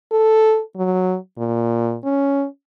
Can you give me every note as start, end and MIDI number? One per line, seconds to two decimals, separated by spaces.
0.12 0.61 69
0.77 1.16 54
1.38 1.97 46
2.04 2.46 61